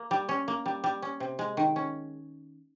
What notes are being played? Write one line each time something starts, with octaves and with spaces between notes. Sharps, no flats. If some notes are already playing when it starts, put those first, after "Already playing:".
Already playing: A#3
G3
C#4
A#3
G3
G3
C#4
C3
G#3
D#3
C#4